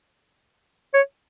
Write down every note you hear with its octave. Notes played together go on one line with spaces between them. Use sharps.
C#5